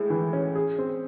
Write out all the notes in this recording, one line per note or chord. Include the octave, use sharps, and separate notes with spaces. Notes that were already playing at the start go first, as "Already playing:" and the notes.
Already playing: A2 G#3
E3
C#4
G#4
C4